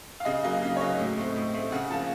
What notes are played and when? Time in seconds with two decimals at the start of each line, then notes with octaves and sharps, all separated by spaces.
0.20 F5
0.25 C#3 D#5
0.44 F#3 A#3 D#5
0.62 C#3 F5
0.76 C#5
0.80 F#3 A#3 D#5
0.98 A2
1.17 A3 C4
1.36 A2
1.54 A3 C4
1.72 C#3 F#5
1.90 F3 A#3 A5